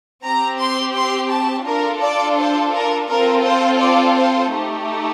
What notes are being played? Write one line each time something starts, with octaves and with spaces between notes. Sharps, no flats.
C4 G4 A#5
C6
C6
A5
D4 F4 A4 A#4
D5
C5
A#4
C4 F4 A4 A#4
C5
D5
C5
A3 D#4 G4